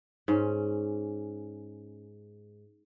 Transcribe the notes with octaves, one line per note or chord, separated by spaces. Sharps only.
G#2 C#4